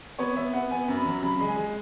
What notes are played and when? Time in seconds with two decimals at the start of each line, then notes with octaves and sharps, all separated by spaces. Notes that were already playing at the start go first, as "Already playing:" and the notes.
0.19 B3 C#5
0.36 B3 E5
0.53 B3 F#5
0.71 B3 G#5
0.88 F#2
0.97 B5
1.06 F#3
1.22 C#3 B5
1.37 G#3 B5
1.48 G#5
1.56 G#3